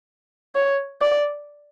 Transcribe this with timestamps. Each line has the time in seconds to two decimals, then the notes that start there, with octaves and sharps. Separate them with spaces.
0.55 C#5
1.02 D5